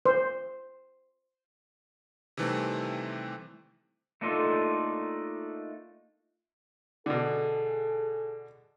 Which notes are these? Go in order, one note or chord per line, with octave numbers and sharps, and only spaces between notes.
C5
C3 D#3 E3 G3 A3 C4
A3 A#3 D4 D#4 F4 A4
B2 D3 G#4 A4